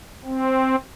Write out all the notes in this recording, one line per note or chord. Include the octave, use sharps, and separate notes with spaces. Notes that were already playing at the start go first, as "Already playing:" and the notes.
C4